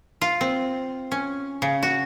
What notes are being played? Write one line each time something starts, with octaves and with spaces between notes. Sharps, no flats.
F4
C4
C#4
C#3
F#4